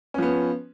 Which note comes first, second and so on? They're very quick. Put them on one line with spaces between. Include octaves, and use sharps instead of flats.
C#4 F3 B3